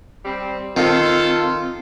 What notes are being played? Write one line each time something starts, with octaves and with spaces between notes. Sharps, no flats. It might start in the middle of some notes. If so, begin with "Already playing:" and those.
G3 C4
D#3 C4 F4 A4